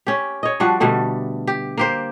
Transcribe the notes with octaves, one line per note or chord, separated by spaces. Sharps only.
C#4 G4
C#5 D#5
F3 G3 D4 F#4
B2 D3 G3 A3
G4
A#3 G4 C5